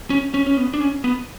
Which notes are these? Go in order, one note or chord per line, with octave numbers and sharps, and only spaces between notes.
C#4
C#4
C#4
B3
D4
C#4
B3